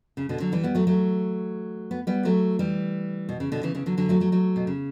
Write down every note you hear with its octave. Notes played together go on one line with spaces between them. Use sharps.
C#3
B2 D3
D3 F#3
E3 G3
G3 B3
F#3 A3
F#3 A3
B3
G3 B3
F#3 A3
E3 G3
B2
C#3
B2 D3
C#3 E3
C#3 E3
D3 F#3
D3 F#3
F#3 A3
F#3 A3
F#3 A3
B2
C#3